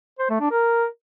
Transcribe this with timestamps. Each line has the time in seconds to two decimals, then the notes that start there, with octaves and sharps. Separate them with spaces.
0.19 C5
0.30 A3
0.41 D4
0.51 A#4